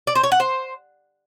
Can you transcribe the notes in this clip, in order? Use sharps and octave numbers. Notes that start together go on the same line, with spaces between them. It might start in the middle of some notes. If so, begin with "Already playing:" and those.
D5
C5
C#5
F#5
C5